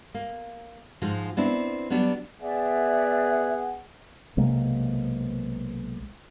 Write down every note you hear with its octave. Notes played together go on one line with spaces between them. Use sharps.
A#3
G#2 F3 G#3 F#4
B3 C4 D4 E4
F#3 G3 B3 D4
B3 G#4 D5 E5 F#5
B1 C3 G#3 A#3